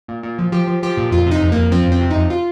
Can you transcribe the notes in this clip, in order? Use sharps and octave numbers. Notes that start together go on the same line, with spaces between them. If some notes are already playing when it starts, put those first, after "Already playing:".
A#2
A#2
F3
F3 G4
F3
F3 G4
A#2
F2 F4
C3
D#4
F2
F2 A#3
F3 C4
F2
C4
C3
F2 D#4
F4